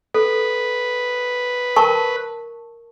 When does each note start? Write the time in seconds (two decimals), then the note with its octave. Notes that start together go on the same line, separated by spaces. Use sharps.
0.15 A4 B4
1.76 A#4 A5 C#6